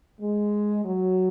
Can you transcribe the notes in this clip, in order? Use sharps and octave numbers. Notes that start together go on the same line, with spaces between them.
G#3
F#3